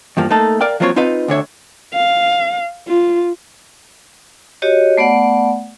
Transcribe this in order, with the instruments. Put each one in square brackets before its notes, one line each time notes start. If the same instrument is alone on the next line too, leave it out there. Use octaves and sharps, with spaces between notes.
[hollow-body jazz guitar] E2 G2 F3 A#3
A3 A#3 D#4 A4
A#4 D5 F5 G5
F3 F#3 A#3 C4 F4 C#5
C4 D#4 F4 B4 F5
D2 D3 C#5 E5
[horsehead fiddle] F5
F4
[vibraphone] F#4 G4 C#5 D#5
A3 B3 D5 F#5